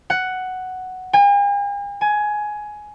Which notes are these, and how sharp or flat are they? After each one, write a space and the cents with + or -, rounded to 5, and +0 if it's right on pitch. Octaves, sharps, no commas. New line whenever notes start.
F#5 +5
G#5 -45
G#5 +15